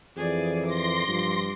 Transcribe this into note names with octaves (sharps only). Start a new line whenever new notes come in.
F2 E3 G#4 D5
C6 D6 A#6
G2 F3